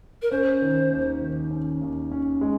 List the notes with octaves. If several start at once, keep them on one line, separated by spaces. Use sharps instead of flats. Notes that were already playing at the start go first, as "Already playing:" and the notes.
A#4
C#4 C5
D#3
D#2
D#3
C#4
D#2
C#4
G#3